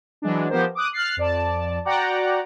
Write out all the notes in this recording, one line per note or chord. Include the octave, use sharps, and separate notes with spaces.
E3 F#3 G#3 D4
F3 B3 G4 A#4 C5
D6 D#6 F#6
F6 F#6 A6 C7
F2 D5 A5
F#4 D5 F#5 G5 A#5 D6